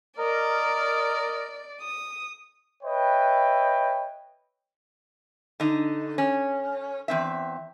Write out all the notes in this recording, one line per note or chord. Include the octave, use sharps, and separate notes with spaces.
A#4 D5 D#5
D#6
B4 C#5 D#5 E5 G5
D3 D#4
C#4
E2 C4 E5